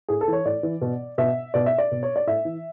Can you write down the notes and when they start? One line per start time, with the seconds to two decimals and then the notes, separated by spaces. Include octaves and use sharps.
0.09 A2 G#4
0.21 A4
0.28 E3
0.33 C#5
0.45 A2 D5
0.63 E3
0.81 B2
1.18 B2 E5
1.54 B2 D5
1.66 E5
1.78 D5
1.91 B2
2.03 C#5
2.16 D5
2.27 A2 E5
2.45 E3